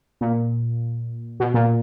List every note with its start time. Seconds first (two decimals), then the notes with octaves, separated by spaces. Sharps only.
0.21 A#2
1.40 B2
1.54 A#2